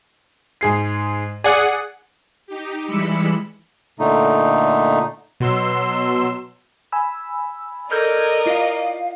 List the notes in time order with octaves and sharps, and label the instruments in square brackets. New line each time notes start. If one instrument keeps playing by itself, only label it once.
[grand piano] G#2 G#4 C7
[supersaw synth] G#4 F#5 [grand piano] D5
[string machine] D#4 G4
E3 G3 G#3 B5 E6 C#7
[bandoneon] A#2 D3 A3 D#4
[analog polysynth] B2 F#3 C6 E6
[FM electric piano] G#5 B5 E6
[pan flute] A4 [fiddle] A#4 [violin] D5 D#5 [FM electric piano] F6 G6 G#6
[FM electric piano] E4 F4 [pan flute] F5